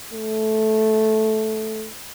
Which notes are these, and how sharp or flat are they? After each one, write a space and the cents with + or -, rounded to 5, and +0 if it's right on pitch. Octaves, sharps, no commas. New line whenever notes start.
A3 -10